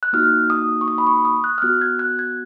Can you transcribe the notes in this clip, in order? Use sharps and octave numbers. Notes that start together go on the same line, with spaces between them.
F#6
A#3 D#4 F#4 F6
D#6
C#6
D#6
B5
C#6
D#6
F#6
F6
B3 F#4 F#6
G#6
F#6
G#6